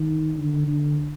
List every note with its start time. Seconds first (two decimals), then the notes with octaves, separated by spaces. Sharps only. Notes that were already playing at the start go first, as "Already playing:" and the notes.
Already playing: D#3
0.37 D3
0.68 D3